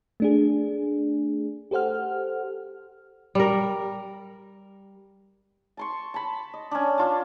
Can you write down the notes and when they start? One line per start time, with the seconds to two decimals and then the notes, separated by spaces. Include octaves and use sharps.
0.20 A3 D4 G#4
1.71 G4 A4 C5 F#5 F6
3.35 G3 A#4
5.77 A5 C6 C#6
6.14 A5 B5
6.54 D#5
6.71 C#4 D4
6.98 D4 F4 A5